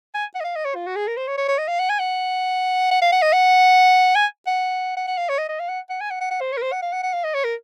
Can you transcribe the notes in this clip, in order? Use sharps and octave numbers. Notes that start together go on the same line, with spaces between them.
G#5
F#5
D#5
F5
D#5
C#5
F4
F#4
G#4
A#4
C5
C#5
C#5
C#5
D#5
F5
F#5
G#5
F#5
F#5
F5
F#5
D#5
F#5
G#5
F#5
F#5
F#5
F5
C#5
D#5
D#5
F5
F#5
F#5
G#5
F#5
F#5
F#5
C5
C#5
A#4
C5
F#5
F5
F#5
F#5
F5
D#5
C#5
A#4